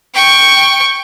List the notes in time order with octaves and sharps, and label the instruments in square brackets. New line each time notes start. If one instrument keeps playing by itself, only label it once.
[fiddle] G5 C#6